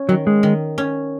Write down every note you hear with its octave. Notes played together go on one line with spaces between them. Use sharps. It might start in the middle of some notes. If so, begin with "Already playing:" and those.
Already playing: C#4
D#3 F#3
G#3
D#3
C#4